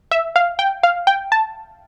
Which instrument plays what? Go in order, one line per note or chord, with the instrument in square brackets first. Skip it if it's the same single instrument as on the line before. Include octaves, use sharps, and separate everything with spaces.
[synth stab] E5
F5
G5
F5
G5
A5